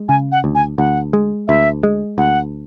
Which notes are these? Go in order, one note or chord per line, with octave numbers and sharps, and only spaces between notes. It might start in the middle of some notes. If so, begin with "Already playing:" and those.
Already playing: G#3
C#3 G#5
F#5
D2
G#5
D2 F#5
G#3
D2 E5
G#3
D2 F#5